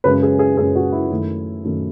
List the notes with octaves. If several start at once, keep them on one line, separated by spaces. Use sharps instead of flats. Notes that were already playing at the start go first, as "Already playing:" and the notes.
F#2 C#3 G#3 C#4 B4
G#4
G#4
F#2 C#3 G#3 C#4 G#4
F#4
E4
F#2 D#3 A3
F#2 D#3 A3